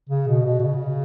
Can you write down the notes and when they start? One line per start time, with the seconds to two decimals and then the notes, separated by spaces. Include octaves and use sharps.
0.09 C#3
0.28 B2
0.45 B2
0.60 B2
0.63 C#3